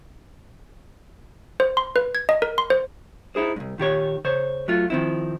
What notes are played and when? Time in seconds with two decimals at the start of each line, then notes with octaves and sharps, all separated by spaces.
1.60 C5
1.77 C6
1.96 B4
2.15 G#6
2.29 D#5
2.42 A#4
2.58 C6
2.70 C5
3.35 D#4 E4 G#4 C5
3.56 C2 G2
3.78 A#2 D#3 G4 C#5
4.25 C#3 C5 C#5
4.68 F#3 A3 F4
4.90 D#3 F3 C4 E4